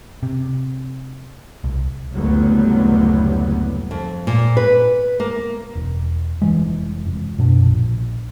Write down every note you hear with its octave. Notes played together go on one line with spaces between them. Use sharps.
C3
C2
F#1 D2 A2 F#3 G3 B3
F2
A#2
B4
A#3
E1
F1 E3 G#3
F1
F#2 B2 D4
A#1